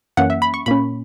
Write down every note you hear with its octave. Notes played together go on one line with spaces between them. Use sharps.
F#2 E3 A#3 C#4 F#5
E5
B5
C#6
A#2 A#3 C#4 B5